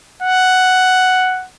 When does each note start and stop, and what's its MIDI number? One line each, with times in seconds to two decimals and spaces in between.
0.22 1.47 78